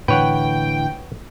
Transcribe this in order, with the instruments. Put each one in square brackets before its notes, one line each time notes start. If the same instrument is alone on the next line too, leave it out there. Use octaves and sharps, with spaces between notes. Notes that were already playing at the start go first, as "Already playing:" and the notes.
[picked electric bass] A2 D3 E3 [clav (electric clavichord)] B4 C#5 F#5 [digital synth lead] G5